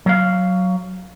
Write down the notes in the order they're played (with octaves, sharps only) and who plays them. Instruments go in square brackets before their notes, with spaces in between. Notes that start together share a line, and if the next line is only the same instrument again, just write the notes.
[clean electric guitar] F#3 F5